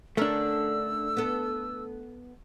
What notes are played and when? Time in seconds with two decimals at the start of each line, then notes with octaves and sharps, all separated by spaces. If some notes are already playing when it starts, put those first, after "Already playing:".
0.17 D3 A3 C#4 D4 A#4 E6
1.17 B3 A4